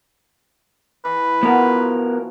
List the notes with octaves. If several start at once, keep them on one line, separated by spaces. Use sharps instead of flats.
E3 B4
B2 F3 B3 F#4 A#4